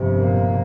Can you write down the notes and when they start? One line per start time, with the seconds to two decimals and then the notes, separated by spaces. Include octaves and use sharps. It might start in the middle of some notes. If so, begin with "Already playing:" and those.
Already playing: G1 F2 C3
0.18 A#2 A#3